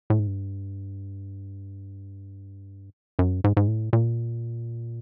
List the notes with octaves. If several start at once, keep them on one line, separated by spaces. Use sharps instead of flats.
A2
G#2
G2
F#2
G#2
G#2
A2
A#2